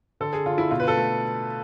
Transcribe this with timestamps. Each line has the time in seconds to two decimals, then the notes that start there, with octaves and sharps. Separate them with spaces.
0.20 D3 A4
0.33 G#4
0.46 D3 F4
0.58 E4
0.71 B2 F4
0.80 B4
0.88 A4
0.97 A3